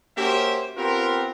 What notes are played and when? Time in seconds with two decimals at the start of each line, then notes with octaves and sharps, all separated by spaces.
0.17 A#3 C#4 F#4 G4 C5 E5
0.77 B3 C4 F4 G4 A#4